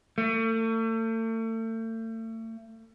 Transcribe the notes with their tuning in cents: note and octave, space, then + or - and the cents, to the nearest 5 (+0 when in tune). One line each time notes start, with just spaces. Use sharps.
A3 +40